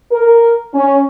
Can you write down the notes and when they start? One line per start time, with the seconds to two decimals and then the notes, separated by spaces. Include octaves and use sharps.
0.12 A#4
0.74 C#4